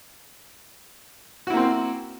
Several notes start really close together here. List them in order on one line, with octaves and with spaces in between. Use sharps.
F#4 E4 A#3 C4